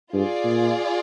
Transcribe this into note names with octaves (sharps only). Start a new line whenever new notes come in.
G2 F4 G#4 D5
A#2